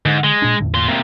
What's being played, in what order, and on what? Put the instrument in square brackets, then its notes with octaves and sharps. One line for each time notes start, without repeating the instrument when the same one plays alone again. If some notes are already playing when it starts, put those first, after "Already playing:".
[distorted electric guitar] G#2 [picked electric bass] D3
[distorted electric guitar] G#3
[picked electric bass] A#2 D4
E2 A2 D3
[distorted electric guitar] A#2 C6
C3 A#3